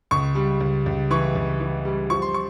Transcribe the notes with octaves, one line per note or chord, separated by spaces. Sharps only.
C#2 C#6
G3
C#2
C#2
E3 C#6
C#2
E3
G3
F3 C#6
C6
C#6